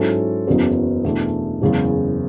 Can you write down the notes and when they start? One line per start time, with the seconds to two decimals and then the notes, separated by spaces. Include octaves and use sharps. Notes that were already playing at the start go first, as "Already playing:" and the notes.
Already playing: G#2 F#3 C#4 E4 A4
0.47 F#1 E2 C#3 F#3 B3
1.04 E2 B2 A3 D4
1.62 F#1 E2 C#3 G#3